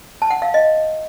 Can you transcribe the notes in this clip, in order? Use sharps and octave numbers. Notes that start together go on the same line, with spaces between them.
A5
F#5
F5
D#5